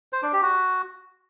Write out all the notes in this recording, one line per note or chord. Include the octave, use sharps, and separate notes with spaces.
C5
D4
G4
F#4